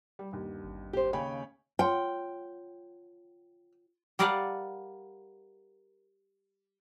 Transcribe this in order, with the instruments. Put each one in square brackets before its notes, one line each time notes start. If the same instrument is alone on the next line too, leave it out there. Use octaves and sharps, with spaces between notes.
[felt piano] G3
G1 D#2
[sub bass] G#1
[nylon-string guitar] G4 C5
[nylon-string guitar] D#2 C#3 C#4 [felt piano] C#5 G5 B5
[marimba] F4 C#5 C6 [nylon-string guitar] G5
[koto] G3 A#4 D5 D#5 F5 F#5